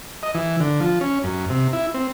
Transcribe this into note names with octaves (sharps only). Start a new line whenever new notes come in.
D#5
E3
D3
F3
C#4
F#2
C3
E4
C4